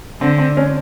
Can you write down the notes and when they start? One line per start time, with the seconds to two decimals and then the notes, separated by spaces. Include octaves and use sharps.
0.21 D3 C4
0.38 C4
0.57 C#4